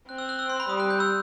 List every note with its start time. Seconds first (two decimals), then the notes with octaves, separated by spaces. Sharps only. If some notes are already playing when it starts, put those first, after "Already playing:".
0.09 C4 F#6
0.18 E6
0.29 F#6
0.39 E6
0.49 C6
0.60 B5
0.69 G3 D#6
0.80 F#6
0.90 G6
1.00 E6